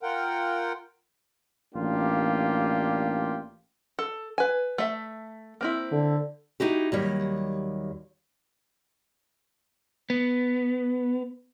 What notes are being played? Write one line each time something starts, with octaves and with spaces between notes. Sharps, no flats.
F4 A#4 F#5 G5
A1 A#3 D4 F4 G4
A4
B4 G#5
A3 E5
A#3 C4 E4
D3
D#4 E4 F#4 G4
D#2 F#3 G3
B3